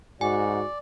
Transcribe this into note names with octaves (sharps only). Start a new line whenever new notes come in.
G#2 F#4 D5 G#5